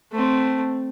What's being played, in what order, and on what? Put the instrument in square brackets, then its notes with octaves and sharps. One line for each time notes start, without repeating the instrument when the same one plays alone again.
[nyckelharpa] A3 C4